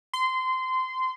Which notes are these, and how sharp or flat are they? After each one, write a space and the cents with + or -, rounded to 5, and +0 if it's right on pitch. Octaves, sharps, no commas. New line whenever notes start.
C6 -20